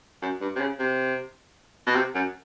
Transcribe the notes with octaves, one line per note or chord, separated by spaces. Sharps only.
F#2
G2
C3
C#3
C3
B2
C3
F#2